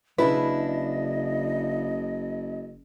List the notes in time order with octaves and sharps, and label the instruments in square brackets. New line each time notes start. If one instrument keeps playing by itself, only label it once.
[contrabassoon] F#1 [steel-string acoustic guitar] C#3 D4 E4 [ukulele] B4 [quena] D#5